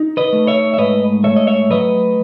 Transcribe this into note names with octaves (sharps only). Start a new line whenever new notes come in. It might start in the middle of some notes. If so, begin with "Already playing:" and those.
Already playing: D#4
B4 D#5
A3
C#5 E5
E5
G#2 B4 D#5
A3 C#5 E5
D#5
C#5 E5
F#3 B4 D#5